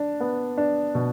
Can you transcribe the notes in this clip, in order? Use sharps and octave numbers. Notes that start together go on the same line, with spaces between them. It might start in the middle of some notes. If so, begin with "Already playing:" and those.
Already playing: D4
B3
D4
B2